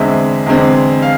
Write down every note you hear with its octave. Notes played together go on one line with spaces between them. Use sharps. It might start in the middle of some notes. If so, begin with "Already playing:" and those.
Already playing: E2 D3 G#3 C4 E5
E2 D3 G#3 C4
F5